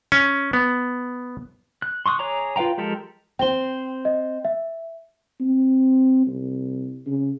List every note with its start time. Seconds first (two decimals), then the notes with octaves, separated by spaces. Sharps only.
0.12 C#4
0.53 B3
1.82 F#6
2.06 C6 C#6 D#6 F#6
2.19 G#4 C#5 A#5 D6
2.56 F4 B4 F5 G5 A#5
2.78 F3 G#3 G4 A4 A#4
3.39 C4 C5 G5 G7
4.05 D#5
4.45 E5
5.40 C4
6.26 C2
7.06 C#3